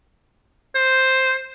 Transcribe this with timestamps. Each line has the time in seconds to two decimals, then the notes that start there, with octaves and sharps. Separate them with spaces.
0.75 C5